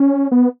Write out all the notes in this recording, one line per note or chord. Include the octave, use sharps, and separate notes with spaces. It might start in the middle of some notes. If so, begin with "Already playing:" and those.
Already playing: C#4
B3